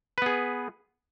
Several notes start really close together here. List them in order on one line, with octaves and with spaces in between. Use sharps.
B4 B3 G#4